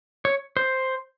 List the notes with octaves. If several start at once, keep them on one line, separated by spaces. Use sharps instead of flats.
C#5
C5